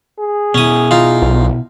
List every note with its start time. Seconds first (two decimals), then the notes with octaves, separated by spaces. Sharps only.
0.19 G#4
0.54 B2 C#4 E4 D#6
0.91 D#4 F4
1.22 B1